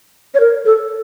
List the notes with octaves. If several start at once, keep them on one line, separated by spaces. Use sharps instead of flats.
C#5
A#4
A4